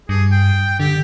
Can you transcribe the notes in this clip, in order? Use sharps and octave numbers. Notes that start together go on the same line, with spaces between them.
G2 G#4
G5
D3 G4